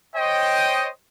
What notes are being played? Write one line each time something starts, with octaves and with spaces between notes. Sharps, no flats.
C5 C#5 D#5 G5